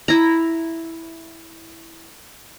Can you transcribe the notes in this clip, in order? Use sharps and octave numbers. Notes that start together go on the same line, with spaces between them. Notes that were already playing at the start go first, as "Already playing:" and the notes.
E4 A#5